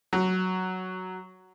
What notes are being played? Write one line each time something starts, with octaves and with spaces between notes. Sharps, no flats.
F#3